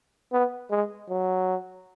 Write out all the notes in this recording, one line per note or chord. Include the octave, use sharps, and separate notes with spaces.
B3
G#3
F#3